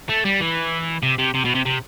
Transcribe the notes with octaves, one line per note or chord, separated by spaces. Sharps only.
A3
G3
E3
C3
C3
C3
B2
C3
C3